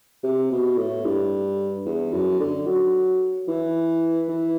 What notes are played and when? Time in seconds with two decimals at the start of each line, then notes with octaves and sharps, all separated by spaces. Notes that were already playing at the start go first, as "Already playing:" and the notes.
0.23 C3
0.51 B2
0.78 A2
1.05 G2
1.86 E2
2.12 F#2
2.40 D3
2.67 F#3
3.48 E3
4.29 E3